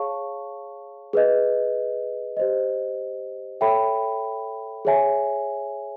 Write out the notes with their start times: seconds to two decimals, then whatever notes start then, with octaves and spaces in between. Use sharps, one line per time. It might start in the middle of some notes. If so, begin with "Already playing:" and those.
Already playing: G#4 C#5 F5 A5 C#6
1.13 G#4 B4 D#5
2.37 G4 C5 D#5
3.61 A4 C#5 E5 G5 B5
4.85 G#4 C#5 E5 G#5